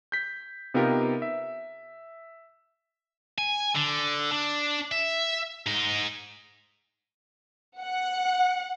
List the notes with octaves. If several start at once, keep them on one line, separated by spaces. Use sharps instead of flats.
G6 B6
C3 B3 D#4 F4 G4 A#4
E5
G#5
D3
D4
E5
G#2 D#4
F#5